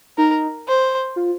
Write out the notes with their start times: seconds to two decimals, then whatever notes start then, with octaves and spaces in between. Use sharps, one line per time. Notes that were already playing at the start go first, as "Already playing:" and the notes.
0.18 D#4 A#4
0.68 C5
1.16 F4